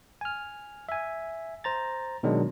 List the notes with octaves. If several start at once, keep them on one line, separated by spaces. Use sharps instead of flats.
G#5 F6
E5 G#5
C5 A#5 A6
B2 D#3 F#3 G#3 D4